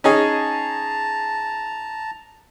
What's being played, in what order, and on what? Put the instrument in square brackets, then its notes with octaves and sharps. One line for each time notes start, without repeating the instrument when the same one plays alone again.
[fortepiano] C#4 D#4 G#4 [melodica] A5 A#5